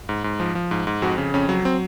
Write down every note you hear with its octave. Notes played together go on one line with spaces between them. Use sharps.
G#2
G#2
F3
F3
G#2
G#2
F2 F#4
C#3
F2 C#4
F#3
C4